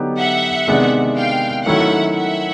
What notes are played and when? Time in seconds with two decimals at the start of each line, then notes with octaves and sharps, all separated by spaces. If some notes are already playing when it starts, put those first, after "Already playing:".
Already playing: D3 F#3 B3 D#4 G4
0.18 E5 F#5
0.68 C3 D#3 G#3 B3 D4
1.17 F5 G5
1.66 D#3 F#3 A3 C#4 E4 E5 F#5
2.16 E5 F#5